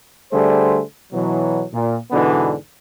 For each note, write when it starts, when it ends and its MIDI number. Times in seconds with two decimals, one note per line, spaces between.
0.31 0.80 50
0.31 0.80 55
0.31 0.80 57
0.31 0.80 68
0.31 0.80 72
1.12 1.64 47
1.12 1.64 52
1.12 1.64 54
1.73 1.96 46
2.11 2.53 44
2.11 2.53 47
2.11 2.53 50
2.11 2.53 52
2.11 2.53 59
2.11 2.53 62